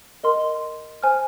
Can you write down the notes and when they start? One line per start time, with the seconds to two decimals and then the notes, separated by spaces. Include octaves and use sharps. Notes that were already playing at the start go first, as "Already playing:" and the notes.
0.24 A#4 D#5 C6
1.03 C5 G#5 F6